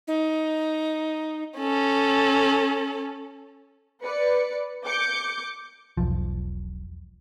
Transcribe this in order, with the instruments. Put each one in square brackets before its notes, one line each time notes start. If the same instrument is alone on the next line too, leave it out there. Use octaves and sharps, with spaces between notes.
[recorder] D#4
[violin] C#4 A4
[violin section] B4 D5 C#7
D6 G6 C#7
[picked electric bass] E1 B1 F3